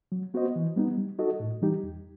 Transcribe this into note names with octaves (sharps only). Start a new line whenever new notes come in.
F#3
B3 F#4 C5 D#5
E3
G3 B3 D#4
G3
D#4 F#4 A4 D#5
A2
E3 G3 D#4 G4
E2